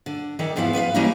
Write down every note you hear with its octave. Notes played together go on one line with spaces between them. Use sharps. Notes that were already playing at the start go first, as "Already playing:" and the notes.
D3
D#3 E3 A4 D5
E2 G#2 F3 B3 E4 F5
B3 B4 E5 F5
E3 G3 A#3 C#4 D#4 E4